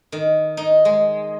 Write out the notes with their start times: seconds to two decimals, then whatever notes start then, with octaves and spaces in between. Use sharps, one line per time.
0.12 D#3
0.57 D#4
0.85 G#3